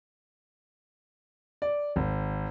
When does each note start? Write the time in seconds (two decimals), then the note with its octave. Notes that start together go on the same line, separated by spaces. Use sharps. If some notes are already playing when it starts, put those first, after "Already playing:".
1.62 D5
1.96 G#1